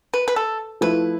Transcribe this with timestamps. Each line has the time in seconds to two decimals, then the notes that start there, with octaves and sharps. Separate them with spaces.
0.14 B4
0.28 B4
0.36 A4
0.81 F3 A3 E4 B4